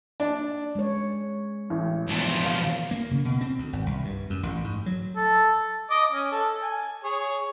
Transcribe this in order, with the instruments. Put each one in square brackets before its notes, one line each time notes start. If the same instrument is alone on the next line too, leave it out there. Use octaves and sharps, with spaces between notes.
[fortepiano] D4
[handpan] G#3 C#5
[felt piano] A1
[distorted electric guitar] B1 F3
[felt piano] F5
[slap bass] A#3
C#3
B2
C4
D2
G#1
C2
G2
F#2
A1
G#2
F#3
[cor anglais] A4
[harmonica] D#5 D6 D#6
C#4
A4
G#5
G#4 C#5